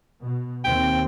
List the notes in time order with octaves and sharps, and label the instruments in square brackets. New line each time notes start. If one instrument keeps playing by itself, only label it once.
[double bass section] B2
[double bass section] D#2 C4 [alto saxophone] G5